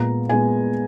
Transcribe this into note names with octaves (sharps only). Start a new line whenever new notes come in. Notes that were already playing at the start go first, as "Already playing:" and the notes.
Already playing: A#2 G#3 B3 A#5
A#2 G#3 B3 G#5